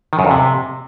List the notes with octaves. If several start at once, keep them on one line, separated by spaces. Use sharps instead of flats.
D#3
F#2
F2
C3